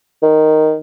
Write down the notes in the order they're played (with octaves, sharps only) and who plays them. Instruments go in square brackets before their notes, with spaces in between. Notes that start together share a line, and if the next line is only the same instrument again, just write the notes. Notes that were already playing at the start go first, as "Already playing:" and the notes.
[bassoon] D#3